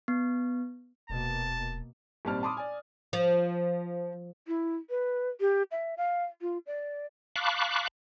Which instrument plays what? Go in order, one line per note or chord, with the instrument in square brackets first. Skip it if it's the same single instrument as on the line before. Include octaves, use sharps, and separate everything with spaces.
[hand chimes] B3
[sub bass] D#1 [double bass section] B2 A#3 [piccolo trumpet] A5
[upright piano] G#1 A#2 G3 C4 A5 F6
A5 B5 C6 D6 D#6
D5 G#5
[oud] F3
[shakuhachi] E4
B4
G4
E5
F5
F4
D5
[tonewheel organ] F5 A5 B5 C#6 D6 F#6